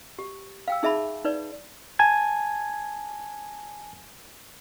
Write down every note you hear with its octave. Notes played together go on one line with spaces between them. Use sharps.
G4
F5 G5 E6
D#4 G#4 E5 A5 B5
D#4 B4 D5
G#5 A5 G#6